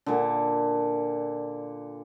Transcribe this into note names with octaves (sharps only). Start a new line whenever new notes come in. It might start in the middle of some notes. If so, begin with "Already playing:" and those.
A#2 D3